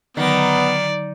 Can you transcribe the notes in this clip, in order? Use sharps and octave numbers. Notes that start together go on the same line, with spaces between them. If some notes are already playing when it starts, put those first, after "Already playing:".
D3 D#3 F#3 B3 D5